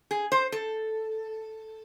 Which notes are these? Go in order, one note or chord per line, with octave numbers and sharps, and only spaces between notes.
G#4
C5
A4